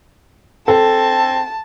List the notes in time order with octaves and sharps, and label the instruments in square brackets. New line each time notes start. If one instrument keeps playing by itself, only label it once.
[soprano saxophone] C4 [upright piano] A4 [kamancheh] A5